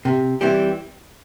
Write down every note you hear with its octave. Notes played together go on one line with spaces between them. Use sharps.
C3
E3 G3 C4 G4